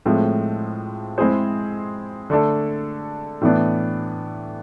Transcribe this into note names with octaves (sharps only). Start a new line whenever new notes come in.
A2 F3 G#3 C4
G#3 C4 E4 G#4 C5
D3 A3 D4 A4
A2 E3 B3 D4